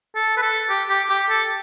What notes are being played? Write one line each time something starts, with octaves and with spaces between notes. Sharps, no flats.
A4
B4
A4
G4
G4
G4
A4